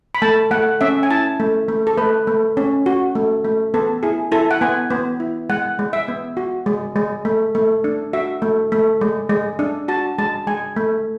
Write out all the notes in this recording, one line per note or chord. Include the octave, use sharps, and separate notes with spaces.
B5
A3 A5
A3 F#5
C#4 E5
G#5
E4 A5
A3
A3
A4
A3 B4
A3
C#4
F#4
A3
A3
B3 A4
E4 G#4
E4 A4
F#5
B3 G#5
B3
E4
G#3 F#5
G#3
E5
B3
F#4
G#3
G#3
A3
A3
D4
F#4 E5
A3
A3
G#3
G#3
D4
F#4 A5
G#3 A5
G#3 G#5
A3